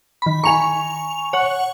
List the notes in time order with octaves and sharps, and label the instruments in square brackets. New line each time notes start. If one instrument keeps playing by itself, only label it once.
[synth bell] D#3 B5
[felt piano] G#5 A#5 [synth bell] C#6 F7
[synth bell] C#5 F#5